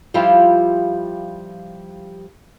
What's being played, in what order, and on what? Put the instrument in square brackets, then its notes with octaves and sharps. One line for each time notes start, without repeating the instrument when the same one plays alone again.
[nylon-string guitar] F3 G3 E4 F4 G4